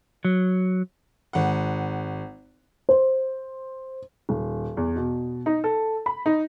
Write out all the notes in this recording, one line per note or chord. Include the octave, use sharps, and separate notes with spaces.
F#3
G#1 F#5
C5
D#1
E2
B2
D#4
A4
B5
D#4